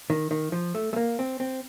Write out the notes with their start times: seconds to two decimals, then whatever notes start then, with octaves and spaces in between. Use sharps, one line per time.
0.10 D#3
0.31 D#3
0.52 F3
0.75 A3
0.93 A3
0.96 A#3
1.19 C4
1.40 C4